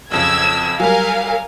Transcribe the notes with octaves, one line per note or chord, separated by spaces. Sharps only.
B1 F2 C#3 E6 G#6
F#3 G3 A#4 F5 G#5